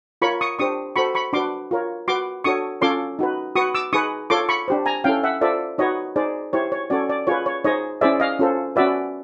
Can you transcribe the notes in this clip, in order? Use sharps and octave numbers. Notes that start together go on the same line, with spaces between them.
F4 A#4 C#5 B5 C#6
C#6 D#6
D4 G4 C5 C#6 D#6
F#4 A4 C5 B5 C#6
B5 C#6
D4 F#4 B4 C6 D6
F4 A#4 C#5
F#4 B4 C6 D6
D4 F#4 A4 C#5 C#6 D#6
C#4 F4 A4 C#5 C6 D6
D#4 F#4 B4
F#4 B4 C#6 D#6
D6 E6
D#4 G#4 B4 C#6 D#6
F4 A4 C#5 C6 D6
B5 C#6
D4 G4 C5
G#5 A#5
C#4 E4 A4 F5 G5
E5 F#5
F4 A4 C5 D5 E5
D#4 F#4 B4 C#5 D#5
D#4 G#4 C5 D5
E4 G4 C5 C#5
C#5
C#4 F#4 A4 C#5 D5
D5
F4 G#4 B4 C#5
C#5
D#4 G#4 C5 C#5 D#5
C#4 E4 G#4 C5 D5 E5
D#5 F5
C#4 F4 A4 C5
C#4 F#4 B4 D5 E5